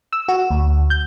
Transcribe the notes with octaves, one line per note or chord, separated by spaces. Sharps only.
E6
F#4
D2
G6